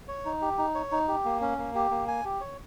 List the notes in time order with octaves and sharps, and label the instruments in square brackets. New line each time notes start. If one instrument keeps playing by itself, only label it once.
[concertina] C#5
D#4
G4
D#4
C#5
D#4
G4
A#3
C#4
A#3
G4
A#3
G#5
G4
C#5